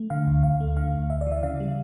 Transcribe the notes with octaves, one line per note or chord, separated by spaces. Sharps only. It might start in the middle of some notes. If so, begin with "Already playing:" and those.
Already playing: A3
D3 F5
D2
D2 F5
A3
D3 F5
D2
D2 E5
D5
E3
E5
C#3 F5
G3